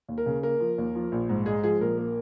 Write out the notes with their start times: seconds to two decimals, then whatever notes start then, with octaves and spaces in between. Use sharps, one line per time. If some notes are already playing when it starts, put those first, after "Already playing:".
0.08 D#2
0.18 A#4
0.26 C#3
0.43 A#3 A#4
0.60 F3
0.78 D#2
0.95 F3
1.12 A#1
1.29 G#2
1.46 G#3 G#4
1.63 F3 G#4
1.80 A#1 A#4
1.97 A#3